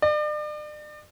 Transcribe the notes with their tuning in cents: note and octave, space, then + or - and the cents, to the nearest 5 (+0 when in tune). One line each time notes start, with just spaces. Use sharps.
D5 +40